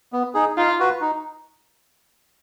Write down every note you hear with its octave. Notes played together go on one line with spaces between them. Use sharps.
B3
D#4 G#4
D#4 F4
F#4 B4
D#4